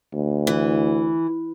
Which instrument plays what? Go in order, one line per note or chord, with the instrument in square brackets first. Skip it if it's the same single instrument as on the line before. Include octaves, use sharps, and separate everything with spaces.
[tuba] D2
[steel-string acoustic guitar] E3